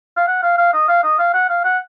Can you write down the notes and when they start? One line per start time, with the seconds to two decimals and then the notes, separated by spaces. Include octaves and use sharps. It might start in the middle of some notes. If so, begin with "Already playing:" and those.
0.17 F5
0.28 F#5
0.43 F5
0.58 F5
0.73 D#5
0.88 F5
1.03 D#5
1.19 F5
1.34 F#5
1.49 F5
1.65 F#5